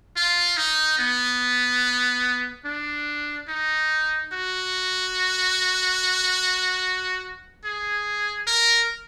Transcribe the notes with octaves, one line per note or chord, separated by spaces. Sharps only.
F4
D#4
B3
D4
D#4
F#4
G#4
A#4